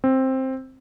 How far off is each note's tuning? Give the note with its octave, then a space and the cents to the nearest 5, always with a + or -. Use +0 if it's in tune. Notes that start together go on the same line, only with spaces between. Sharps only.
C4 +10